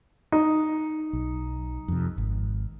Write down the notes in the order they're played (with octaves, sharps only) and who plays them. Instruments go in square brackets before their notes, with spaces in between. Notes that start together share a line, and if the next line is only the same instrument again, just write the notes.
[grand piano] D#4
[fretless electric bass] B1
F2 C3
G#1